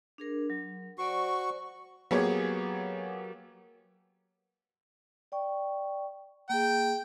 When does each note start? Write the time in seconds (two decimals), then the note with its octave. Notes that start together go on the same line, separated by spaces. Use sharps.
0.18 D4 G#4 A#4
0.50 F#3
0.98 F#4 C5 D5 G#5 C#6
2.11 F#3 A#3 B3 G4 G#4 C#5
5.32 D5 G5 C#6
6.50 A#3 G#4 G5